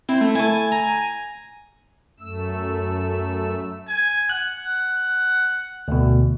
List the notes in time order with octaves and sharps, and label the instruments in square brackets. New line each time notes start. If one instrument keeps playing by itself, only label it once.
[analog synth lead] C4 [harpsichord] E4
[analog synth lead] A3
[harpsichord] A3 E4 [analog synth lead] G#5
[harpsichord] A#5
[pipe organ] F#2 A3 E6
[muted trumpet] G#5
[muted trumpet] F#5 [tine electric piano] F#6
[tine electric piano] D2 B2